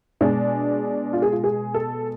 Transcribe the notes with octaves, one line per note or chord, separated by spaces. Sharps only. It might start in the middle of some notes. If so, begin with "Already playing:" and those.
B2 G#3 D4
F4
G#4
F4
G#4
A4